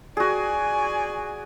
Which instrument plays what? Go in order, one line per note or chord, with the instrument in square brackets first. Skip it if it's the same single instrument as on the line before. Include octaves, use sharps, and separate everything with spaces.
[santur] F#4 G#4 [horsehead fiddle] D5 G#5